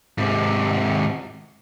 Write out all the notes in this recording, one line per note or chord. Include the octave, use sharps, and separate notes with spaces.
G#2 C3